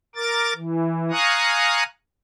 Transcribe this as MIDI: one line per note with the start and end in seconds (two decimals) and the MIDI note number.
0.16 0.53 70
0.16 0.53 86
0.16 0.53 93
0.56 1.11 52
1.11 1.83 77
1.11 1.83 80
1.11 1.83 82
1.11 1.83 85
1.11 1.83 87
1.11 1.83 90